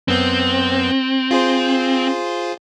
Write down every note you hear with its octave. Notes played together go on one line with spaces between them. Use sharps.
F#2 B3 C4 G6
F4 G#4 C5